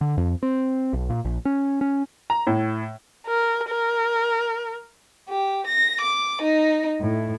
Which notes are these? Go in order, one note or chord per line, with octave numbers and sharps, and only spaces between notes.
D3
F2
C4
B1
A#2
A#1
C#4
C#4
A#5
A2
A#4
A#4
G4
A#6
D6
D#4
A2